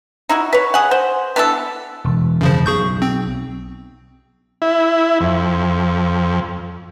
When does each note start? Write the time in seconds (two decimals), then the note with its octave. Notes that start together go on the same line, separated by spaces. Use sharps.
0.29 D#4 E4 F#4
0.53 B4 C#5
0.74 G#4 F#5
0.91 C5
1.36 B3 D4 E4 A4
2.04 E1
2.41 F#2 C#3 F3
2.66 B1 G#4 C#6 G6
3.02 C4
4.62 E4
5.20 F2